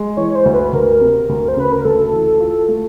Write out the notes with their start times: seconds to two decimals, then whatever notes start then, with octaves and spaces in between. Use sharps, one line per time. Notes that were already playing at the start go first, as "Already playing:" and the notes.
Already playing: G#3
0.17 E3 C#5
0.31 C#5
0.35 C5
0.45 D2
0.54 B4
0.73 D2 A#4
1.01 C3
1.29 D2
1.48 C5
1.57 C#3 B4
1.72 A#4
1.85 D2 A4
2.13 E3
2.40 F4
2.68 A3